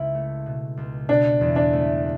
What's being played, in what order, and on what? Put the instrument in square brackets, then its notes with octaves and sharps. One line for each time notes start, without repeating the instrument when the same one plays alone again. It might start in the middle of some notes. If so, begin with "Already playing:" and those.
Already playing: [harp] C#2 E4
A3
B2
C#2
[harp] B2 [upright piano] D4
[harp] E2
[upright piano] D4
[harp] A3